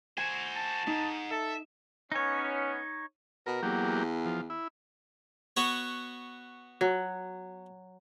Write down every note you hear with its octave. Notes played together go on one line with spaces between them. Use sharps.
F#4 C5 G#5
A5
G#2 D#4
A4 E5
B3 C#4 D#4 C#5
B2 A#4
E2 F#3 A#3 G4
F3
E4
B3 F#4 C#5
F#3